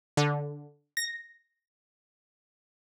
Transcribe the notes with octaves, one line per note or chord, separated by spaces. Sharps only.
D3
A#6